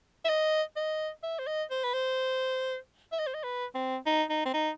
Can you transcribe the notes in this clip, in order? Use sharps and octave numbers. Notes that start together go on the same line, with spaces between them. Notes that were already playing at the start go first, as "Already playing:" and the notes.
E5
D#5
D#5
E5
C5
D#5
C5
B4
C5
E5
D#5
C5
D#5
B4
C4
D#4
D#4
C4
D#4